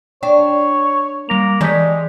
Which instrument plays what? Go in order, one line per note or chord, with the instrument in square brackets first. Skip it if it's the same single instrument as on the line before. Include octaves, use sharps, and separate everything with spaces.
[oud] D4 [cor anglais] C#5 [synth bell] G5
[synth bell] G3 A#6 F7 [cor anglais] A#3
[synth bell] E3 G6 B6 [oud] G3 C#4 [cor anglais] G#3